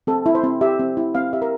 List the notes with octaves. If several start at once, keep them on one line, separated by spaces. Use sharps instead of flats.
C4 A4
E4
C5
C4
G4 E5
C4
E4
C4 F5
G4 E5
A#4